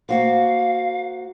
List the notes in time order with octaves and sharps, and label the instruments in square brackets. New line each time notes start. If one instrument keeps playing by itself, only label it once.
[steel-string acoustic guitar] A#3 F#4 C5 [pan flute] F5